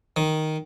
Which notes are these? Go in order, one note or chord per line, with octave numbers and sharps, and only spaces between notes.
D#3